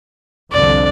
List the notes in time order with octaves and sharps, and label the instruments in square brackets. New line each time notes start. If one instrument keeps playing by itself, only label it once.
[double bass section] C2 F2 D3 [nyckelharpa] D5